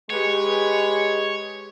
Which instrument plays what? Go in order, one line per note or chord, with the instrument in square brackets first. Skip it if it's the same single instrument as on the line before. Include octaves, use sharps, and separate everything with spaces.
[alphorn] G#3 [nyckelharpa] G4 B4 [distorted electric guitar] C#5